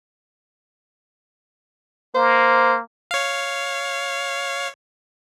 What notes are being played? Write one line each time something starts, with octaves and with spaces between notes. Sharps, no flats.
A#3 C5
C#5 F5